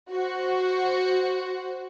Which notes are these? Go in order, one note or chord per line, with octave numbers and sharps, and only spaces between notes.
F#4 C5